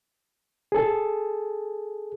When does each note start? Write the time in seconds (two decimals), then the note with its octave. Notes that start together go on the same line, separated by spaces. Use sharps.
0.72 G#4 A4